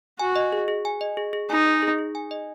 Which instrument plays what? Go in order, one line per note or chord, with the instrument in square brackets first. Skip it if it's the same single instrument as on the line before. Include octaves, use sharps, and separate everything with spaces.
[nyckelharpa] F#4 [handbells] G#5
[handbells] D#5
G#4
G#4
G#5
D#5
G#4
G#4
[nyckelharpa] D#4 [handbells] G#5
[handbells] D#5
G#4
G#4
G#5
D#5